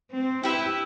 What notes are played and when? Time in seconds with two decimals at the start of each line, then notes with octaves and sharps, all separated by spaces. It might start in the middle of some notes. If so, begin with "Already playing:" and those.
0.12 C4
0.43 E4 G4 B4 E5 G5